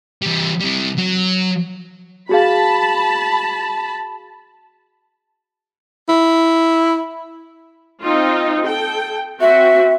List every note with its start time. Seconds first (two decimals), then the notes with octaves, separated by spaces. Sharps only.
0.22 E3 G3
0.61 C3 G3
0.98 F#3
2.29 F#4 G#4 F5 A5 B5
6.09 E4
8.01 C4 D#4 F4
8.65 A4 G5
9.41 C4 F#4 E5